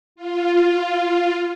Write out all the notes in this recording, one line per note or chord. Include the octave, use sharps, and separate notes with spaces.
F4